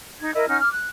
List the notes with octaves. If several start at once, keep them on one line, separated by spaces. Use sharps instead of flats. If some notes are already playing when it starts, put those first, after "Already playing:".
D#4 G#6
E4 A#4 D#5
C#4 D#4 F#5 F6
D6 F6
F#6